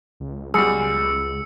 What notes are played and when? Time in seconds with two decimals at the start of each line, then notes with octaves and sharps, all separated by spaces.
0.20 C#2
0.54 F#2 B2 G3 G#4 E6 C#7